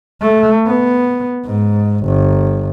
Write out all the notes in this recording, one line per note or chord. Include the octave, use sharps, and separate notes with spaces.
A3
B3
G#2
G1